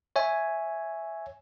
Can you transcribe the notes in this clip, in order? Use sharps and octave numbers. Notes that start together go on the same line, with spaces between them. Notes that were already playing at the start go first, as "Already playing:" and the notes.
C#5 E5 G#5